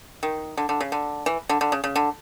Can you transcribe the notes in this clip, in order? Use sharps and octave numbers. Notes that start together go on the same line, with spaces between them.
D#3
D3
D3
C#3
D3
E3
D3
D3
C#3
C#3
D3